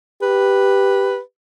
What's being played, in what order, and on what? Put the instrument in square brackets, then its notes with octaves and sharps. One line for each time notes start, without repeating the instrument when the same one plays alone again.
[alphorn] G4 [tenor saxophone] B4